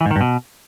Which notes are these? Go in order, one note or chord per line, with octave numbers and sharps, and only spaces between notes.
E3
G#2
D#3
G2
B2